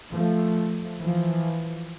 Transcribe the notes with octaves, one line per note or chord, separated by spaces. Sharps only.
F3 A3
E3 F3